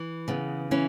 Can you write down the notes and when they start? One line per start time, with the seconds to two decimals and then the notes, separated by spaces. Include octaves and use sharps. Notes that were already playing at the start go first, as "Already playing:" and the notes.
Already playing: E3
0.28 C#3 B3
0.71 E3 C#4